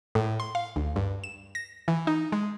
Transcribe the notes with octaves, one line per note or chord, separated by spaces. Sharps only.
A2
C6
F5
D2
G2
E7
A#6
E3
D#4
G#3